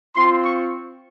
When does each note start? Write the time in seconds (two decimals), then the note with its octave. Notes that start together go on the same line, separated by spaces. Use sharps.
0.15 C4 F4 C6
0.44 C#6